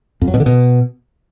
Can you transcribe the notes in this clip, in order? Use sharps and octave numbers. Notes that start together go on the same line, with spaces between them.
F2
F#3
B2
D3
B2